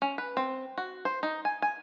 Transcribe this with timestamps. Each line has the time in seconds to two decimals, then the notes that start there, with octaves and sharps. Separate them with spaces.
0.02 C#4
0.18 B4
0.37 C4
0.78 F#4
1.05 C5
1.23 D#4
1.45 G#5
1.62 G#5